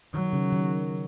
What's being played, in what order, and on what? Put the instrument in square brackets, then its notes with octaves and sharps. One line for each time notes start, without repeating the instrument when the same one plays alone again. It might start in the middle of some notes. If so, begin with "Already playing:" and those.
[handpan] D#3 [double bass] F#3
[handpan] C#3
D#3